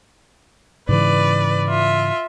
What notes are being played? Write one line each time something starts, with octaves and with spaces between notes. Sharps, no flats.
G#2 C#3 E3 B4 D5
F4 E5